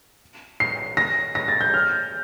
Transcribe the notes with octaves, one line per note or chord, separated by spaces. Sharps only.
C7
A#6
A#6
A6
G6
F6